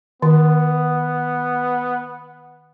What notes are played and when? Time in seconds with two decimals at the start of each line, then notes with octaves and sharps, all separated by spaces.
0.22 D#3 B3